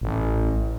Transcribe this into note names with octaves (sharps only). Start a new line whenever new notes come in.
A1